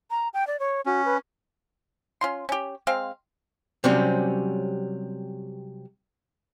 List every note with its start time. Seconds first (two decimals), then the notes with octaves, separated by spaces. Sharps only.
0.11 A#5
0.34 G5
0.47 D5
0.60 C#5
0.86 C#4 F#4
1.05 B4
2.21 C#4 F4 C6
2.49 C#4 G4
2.87 G#3 C4 F5
3.84 C3 F#3 G3 C4 C#4